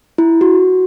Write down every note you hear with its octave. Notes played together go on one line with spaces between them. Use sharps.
E4
F#4